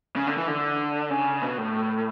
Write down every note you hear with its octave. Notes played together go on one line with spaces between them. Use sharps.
C#3
D3
E3
D3
C#3
B2
A2